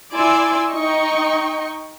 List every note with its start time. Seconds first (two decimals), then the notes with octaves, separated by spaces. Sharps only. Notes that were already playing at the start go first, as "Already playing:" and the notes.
0.13 E4 D5 G#5 C6 D6 E6
0.69 D#4 D#5 G5 C#6